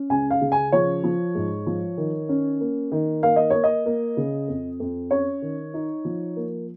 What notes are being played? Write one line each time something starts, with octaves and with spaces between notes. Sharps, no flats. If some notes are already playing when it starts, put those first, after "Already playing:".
Already playing: C#4
C#2 G#5
F5
C#3
G#5
F3 C#5
F3
G#2
F3
D#3
C#4
A#3
D#3
A#3 F5
D#5
A#3 C#5
D#5
A#3
C#3
F2
F2
C#4 C#5
D#3
D#4
F3
A#3